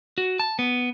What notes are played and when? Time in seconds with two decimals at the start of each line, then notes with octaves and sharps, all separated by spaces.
0.18 F#4
0.40 A5
0.59 B3